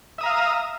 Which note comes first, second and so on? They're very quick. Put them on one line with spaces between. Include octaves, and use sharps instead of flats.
E5 D#6 A#5 F5